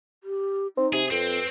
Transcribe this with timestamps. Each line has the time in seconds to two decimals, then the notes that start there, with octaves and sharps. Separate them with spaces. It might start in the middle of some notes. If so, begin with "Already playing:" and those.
0.24 G4
0.77 C4 D#4
0.93 C3 G#4
1.11 F2 C4 B4